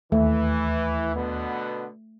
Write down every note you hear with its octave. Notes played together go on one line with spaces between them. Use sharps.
D#2 E3 A3
B2 D3 B3